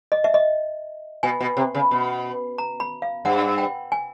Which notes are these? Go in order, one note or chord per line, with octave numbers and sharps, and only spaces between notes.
D#5
E5
D#5
B2 G#5
B2
C3
C#3
B2
A#5
B5
F5
G2 F#5
G5
G#5